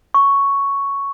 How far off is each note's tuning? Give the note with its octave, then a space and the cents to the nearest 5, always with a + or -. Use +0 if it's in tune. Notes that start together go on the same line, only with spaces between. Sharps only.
C#6 +5